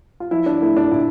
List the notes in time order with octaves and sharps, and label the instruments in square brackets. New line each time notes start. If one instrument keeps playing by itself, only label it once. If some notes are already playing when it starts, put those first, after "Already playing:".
[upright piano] F4
F3 E4
D4
A3 E4
D4
A#2 E4